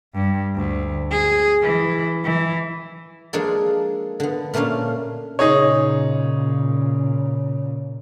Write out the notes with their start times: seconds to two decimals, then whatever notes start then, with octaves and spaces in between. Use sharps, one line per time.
0.14 G2
0.56 D2
1.11 G#4
1.63 E3
2.24 E3
3.33 F3 G#3 A#3 D4 G#4 A4
4.20 D3 B3
4.54 A#2 A3 A#3 C#4 D4 F5
5.39 A#2 C#3 D#4 G#4 C#5